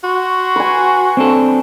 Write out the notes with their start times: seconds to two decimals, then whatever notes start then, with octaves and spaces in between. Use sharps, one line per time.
0.03 F#4 C6 C#6
0.56 B4 G#5
1.17 C4 D4 A4